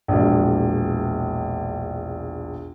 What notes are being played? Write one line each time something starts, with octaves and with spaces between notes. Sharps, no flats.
E1 A#1